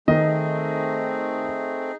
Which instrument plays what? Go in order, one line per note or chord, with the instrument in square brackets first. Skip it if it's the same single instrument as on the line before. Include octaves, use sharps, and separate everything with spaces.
[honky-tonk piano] D#3 [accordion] A3 C4 [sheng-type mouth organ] D#4 G#4 [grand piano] D#5